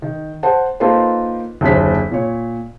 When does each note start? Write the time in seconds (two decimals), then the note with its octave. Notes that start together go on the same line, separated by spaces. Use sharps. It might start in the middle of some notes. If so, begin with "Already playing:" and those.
0.02 D#3
0.43 C5 F#5 A5
0.80 A#3 D#4 F4 A4 B4 C5
1.61 F#1 D#2 D3 C5 B6
2.11 A#2 C#5